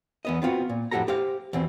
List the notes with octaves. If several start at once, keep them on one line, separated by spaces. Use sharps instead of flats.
E2 B3 D#5
B3 C4 F4 F#4 F#5
A#2
F2 A2 F#4 G4 A4 A#5
G4 C5 F5
E2 B2 C4